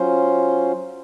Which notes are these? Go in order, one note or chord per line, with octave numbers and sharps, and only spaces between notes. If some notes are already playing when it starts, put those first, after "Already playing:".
Already playing: F#3 C#4 F4 C5